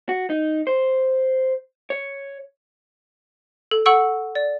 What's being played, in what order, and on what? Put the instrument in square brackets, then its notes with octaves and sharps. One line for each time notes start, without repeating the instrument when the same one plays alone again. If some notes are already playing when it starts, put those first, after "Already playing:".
[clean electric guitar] F#4
D#4
C5
C#5
[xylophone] A4
A4 F#5 C#6 E6 D7
D5